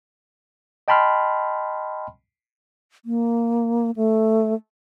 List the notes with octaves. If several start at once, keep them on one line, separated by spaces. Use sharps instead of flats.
D#5 G5 A5 B5 C6 F6
A#3
A3